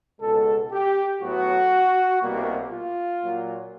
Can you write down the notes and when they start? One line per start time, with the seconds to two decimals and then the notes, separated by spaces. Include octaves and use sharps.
0.21 C#2 B2 G#3 A4
0.72 G4
1.21 A2 F#3 B3 F#4
2.22 C2 B2 G3 A#3
2.71 F4
3.22 A#2 F#3 A#3